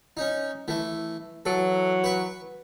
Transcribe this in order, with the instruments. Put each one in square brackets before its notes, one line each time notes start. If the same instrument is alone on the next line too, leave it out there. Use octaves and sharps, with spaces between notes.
[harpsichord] C#4 D#4
E3 A3
[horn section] E3 F#3 [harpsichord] A4
[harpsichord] B4 C#6